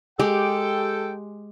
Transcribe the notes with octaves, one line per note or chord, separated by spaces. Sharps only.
G#3 G4 A4 G5